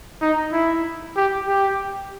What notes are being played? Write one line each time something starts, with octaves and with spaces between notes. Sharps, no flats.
D#4
E4
G4
G4